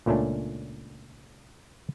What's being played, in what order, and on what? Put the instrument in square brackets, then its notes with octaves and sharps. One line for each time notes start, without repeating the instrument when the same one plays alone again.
[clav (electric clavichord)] C#2 A#2 A3 C#4 D4